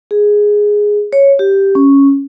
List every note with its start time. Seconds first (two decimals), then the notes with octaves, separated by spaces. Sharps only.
0.11 G#4
1.13 C#5
1.39 G4
1.75 C#4